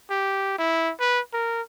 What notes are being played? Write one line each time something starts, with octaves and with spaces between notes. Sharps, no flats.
G4
E4
B4
A#4